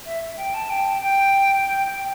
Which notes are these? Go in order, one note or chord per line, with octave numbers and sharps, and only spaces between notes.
E5
G5
A5
G5
G5
G5